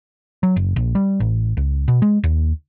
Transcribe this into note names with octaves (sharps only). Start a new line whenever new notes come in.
F#3
F#1
A#1
G3
A1
C#2
B2
G#3
D#2